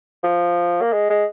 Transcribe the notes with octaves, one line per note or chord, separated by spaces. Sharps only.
F3
A#3
G#3
G#3